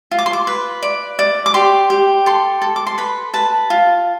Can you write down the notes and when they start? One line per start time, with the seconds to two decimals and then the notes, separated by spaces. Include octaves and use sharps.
0.11 F4
0.19 D6
0.26 C6
0.33 D6
0.47 B4
0.82 D5
1.19 D5
1.46 D6
1.54 G4 C6
1.90 G4
2.26 A4 C6
2.62 A4
2.76 D6
2.86 C6
2.98 B4 B5
3.34 B4 A5
3.70 F4